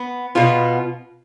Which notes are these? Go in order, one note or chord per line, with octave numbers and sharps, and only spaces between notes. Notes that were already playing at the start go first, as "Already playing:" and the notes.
Already playing: B3
B2 B3 F4